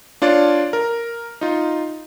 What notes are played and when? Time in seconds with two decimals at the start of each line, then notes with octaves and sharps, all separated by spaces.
0.22 D4 F4 C#5 D5
0.73 A#4
1.41 D#4 F4